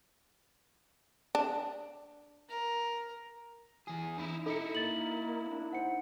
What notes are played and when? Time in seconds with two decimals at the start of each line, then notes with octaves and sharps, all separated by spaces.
1.35 D4
2.49 A#4
3.87 E2 G#4
4.18 D#4 E4
4.46 D#4 E4 A4 C#7
4.75 A#3 A6 F#7
5.49 D4
5.73 C5 F#5 C#7